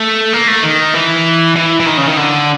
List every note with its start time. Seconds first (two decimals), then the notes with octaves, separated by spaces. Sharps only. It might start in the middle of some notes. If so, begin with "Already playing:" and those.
Already playing: A3
0.33 A#3
0.48 A3
0.63 D#3
0.94 E3
1.56 E3
1.80 E3
1.86 D#3
1.97 C#3
2.07 D#3
2.17 D3